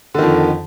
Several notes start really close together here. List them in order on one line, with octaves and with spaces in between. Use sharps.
D3 D#3 F2